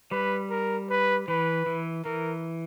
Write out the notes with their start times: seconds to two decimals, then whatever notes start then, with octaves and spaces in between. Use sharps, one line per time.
0.11 G3 B4
0.50 A#4
0.89 B4
1.28 E3 B4
1.66 E3
2.05 E3 A#4